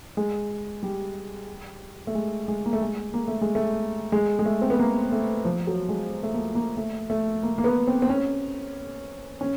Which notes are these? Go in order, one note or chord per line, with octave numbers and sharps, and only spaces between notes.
G#3
G3
A3
G#3
G#3
A#3
A3
G#3
A#3
A3
G#3
A3
G#3
G#3
A3
C4
B3
A#3
A3
F3
F#3
G#3
A3
A#3
A#3
A3
A3
A#3
A#3
B3
C4
C4
C#4
C#4